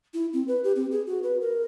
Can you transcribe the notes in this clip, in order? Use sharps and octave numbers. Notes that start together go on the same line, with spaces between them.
E4
C4
B4
G4
C4
G#4
F#4
B4
A#4